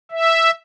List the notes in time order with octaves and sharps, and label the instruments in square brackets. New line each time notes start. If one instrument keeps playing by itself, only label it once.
[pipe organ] E5